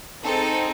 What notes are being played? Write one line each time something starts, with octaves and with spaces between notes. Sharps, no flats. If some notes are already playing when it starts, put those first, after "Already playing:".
C4 D#4 G#4 A4